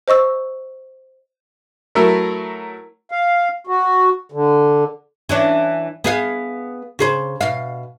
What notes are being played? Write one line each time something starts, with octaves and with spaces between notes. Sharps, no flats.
C5 D#5 C#6 E6
F#3 A3 E4 A#4
F5
F#4
D3
E3 C#4 D4
B3 G#4 F5
C#3 G#4 C5
B2 F5